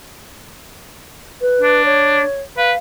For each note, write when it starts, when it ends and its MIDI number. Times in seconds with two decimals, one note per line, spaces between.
1.41 1.84 71
1.61 2.22 62
1.85 2.40 73
2.57 2.72 71
2.57 2.78 77